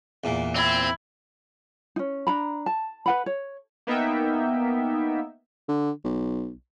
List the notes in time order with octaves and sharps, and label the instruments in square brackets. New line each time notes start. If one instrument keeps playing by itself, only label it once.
[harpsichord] E2 A#2
[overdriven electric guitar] C4 [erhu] E4
[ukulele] C#4 D#4
D4 A#5 B5
A5
B4 F#5 B5
C#5
[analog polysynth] A#3 B3 D#4 A#4 E5 G5
[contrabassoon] D3
B1